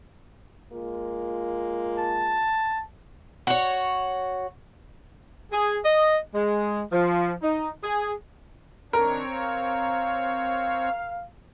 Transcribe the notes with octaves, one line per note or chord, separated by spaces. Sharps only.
G#3 A#3 F4
A5
F#4 C#5
G#4
D#5
G#3
F3
D#4
G#4
D#3 C4 D4 A#4 C#5
F5